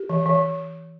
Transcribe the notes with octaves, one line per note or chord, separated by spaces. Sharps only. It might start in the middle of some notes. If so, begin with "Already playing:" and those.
Already playing: G4
E3
E3